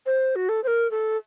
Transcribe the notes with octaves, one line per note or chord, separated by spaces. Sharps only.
C5
F#4
A4
C5
A#4
A4